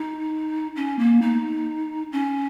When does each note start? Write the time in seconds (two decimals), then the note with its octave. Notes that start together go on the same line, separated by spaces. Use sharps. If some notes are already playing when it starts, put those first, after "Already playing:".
Already playing: D#4
0.76 C#4
0.99 A#3
1.21 D#4
2.12 C#4